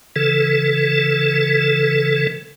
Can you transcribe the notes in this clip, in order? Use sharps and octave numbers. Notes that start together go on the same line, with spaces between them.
C#3 E3 A4